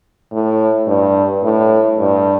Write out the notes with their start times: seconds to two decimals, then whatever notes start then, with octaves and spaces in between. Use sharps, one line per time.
0.32 A2
0.87 G2
1.43 A2
1.98 G2